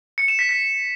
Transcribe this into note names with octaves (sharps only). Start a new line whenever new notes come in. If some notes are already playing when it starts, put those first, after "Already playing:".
C#7
E7
B6
B6